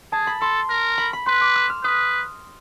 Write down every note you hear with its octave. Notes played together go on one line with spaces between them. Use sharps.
G#4 A5
B5
A4 C6
A#4
B5
B5
B4 C6
D6
E6
F6
B4 D#6